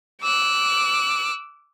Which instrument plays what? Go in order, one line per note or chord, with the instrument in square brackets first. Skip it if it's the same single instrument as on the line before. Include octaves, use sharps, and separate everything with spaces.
[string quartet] D6 E6 F#6